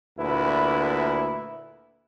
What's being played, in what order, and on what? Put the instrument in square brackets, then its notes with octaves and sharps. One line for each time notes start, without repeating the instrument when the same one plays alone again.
[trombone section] D2 A#2 E4 B4